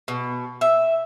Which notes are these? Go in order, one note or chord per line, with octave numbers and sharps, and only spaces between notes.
B2
E5